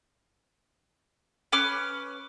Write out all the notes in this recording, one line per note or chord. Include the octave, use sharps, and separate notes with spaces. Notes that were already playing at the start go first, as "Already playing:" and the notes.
C#4 B4 D6 F6